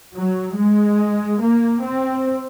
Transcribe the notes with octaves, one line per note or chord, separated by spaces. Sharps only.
F#3
G#3
A#3
C4